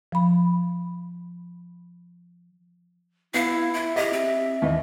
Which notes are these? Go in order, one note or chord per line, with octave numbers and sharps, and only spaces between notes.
F3 B5
B3 E4 F5
E4 E5
G4 D#5
C4
D#2 E3 D#5